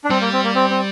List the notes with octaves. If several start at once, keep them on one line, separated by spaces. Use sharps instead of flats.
D4
G3 C4
A#3
C4
A#3
C4
C4